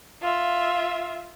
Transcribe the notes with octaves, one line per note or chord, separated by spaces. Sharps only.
F4 E5